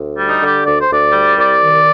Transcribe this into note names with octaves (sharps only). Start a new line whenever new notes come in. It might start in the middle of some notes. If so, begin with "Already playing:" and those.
Already playing: D2
G3
D#4
D3
G4
D2 D5
C5
D2 D5
G3
C2 D5
D#3